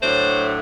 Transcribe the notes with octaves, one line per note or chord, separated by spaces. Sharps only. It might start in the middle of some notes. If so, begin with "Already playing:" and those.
A2 F#3 A3 D4 C5